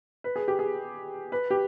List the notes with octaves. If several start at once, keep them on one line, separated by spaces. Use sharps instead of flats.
B4
G#4
G4
G#4
B4
G4